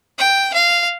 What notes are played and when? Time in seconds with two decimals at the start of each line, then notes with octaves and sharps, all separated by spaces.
0.18 G5
0.54 F5